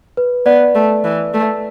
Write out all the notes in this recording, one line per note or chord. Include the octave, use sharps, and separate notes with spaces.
B4
B3 D5
A3
E3
A3